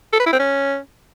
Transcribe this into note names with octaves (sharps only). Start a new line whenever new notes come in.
A4
B4
E4
C4
C#4